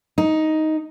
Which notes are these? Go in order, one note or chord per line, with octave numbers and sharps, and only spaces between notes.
D#4